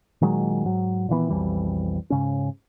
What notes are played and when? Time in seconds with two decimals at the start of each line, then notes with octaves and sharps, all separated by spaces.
0.21 A#2 D#3 F#3 G#3
0.65 G#2 F#3
1.09 A#2 D#3 E3 B3
1.30 B1 F2 E3 G3
2.10 G#2 C#3 C#4